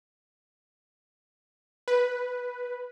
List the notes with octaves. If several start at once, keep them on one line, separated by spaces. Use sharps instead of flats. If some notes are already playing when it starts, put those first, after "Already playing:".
B4